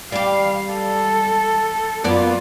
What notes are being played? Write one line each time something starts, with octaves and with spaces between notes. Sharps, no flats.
G3 G4 F5
A4
F#2 A#3 B3 F4 D5